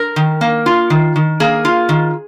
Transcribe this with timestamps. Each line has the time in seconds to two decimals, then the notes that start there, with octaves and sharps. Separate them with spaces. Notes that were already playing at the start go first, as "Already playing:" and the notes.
Already playing: A#4
0.16 D#3
0.41 A#3
0.66 F4
0.90 D#3
1.16 D#3
1.40 A#3 G#4
1.65 F4
1.89 D#3